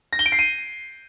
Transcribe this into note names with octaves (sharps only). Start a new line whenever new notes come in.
A#6
G7
D7
C7
D#7